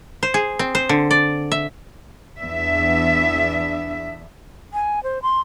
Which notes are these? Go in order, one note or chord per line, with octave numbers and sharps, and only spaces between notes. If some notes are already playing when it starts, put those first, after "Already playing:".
C5
G#4
C4
C5
D3
D5
E5
E2 B3 D4 E5
G#5
C5
C6